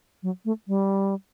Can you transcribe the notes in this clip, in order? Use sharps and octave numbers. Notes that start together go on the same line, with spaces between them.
F#3
A3
G3